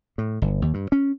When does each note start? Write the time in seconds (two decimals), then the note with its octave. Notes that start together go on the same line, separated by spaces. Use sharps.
0.18 A2
0.42 G1
0.62 D#2
0.74 G2
0.92 C#4